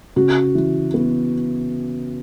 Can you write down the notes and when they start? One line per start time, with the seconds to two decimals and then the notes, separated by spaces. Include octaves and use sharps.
0.16 C#3 F#4
0.55 E3
0.94 B3